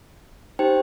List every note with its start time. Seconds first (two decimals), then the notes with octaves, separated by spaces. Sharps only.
0.59 D#4 G4 C5 G5